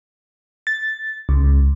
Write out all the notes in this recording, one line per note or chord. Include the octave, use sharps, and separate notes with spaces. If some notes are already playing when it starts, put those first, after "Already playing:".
A6
C#2